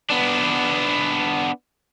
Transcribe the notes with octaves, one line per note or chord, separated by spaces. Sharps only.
B3 D4